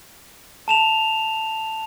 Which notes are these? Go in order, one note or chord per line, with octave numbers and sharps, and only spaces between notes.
A5 E7 F7